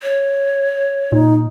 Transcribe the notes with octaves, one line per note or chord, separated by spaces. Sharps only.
C#5
A#2 D#4